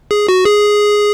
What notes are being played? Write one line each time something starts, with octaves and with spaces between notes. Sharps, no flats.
G#4
F#4
G#4